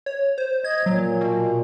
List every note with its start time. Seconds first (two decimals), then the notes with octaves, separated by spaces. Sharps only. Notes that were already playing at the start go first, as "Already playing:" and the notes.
0.06 C#5
0.38 C5
0.64 D#5 G#6
0.86 A#2 F#3
1.21 B2